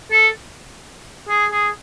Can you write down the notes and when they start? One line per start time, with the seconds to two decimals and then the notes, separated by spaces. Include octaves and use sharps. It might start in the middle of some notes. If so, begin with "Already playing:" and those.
0.11 A4
1.29 G#4
1.52 G#4